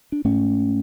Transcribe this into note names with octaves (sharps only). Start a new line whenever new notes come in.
D4
G#2 A3 C#4